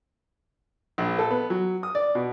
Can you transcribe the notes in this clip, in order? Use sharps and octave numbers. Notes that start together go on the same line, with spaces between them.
A#1
A4
B3
F#3
D#6
D5
B2